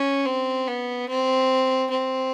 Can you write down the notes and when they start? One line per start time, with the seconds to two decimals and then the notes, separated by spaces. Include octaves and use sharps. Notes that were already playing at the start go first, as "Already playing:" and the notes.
Already playing: C#4
0.25 C4
0.67 B3
1.09 C4
1.90 C4